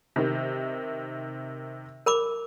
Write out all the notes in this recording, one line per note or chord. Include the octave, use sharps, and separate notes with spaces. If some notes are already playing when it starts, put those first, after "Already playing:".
C3 D#3
A#4 B5 D6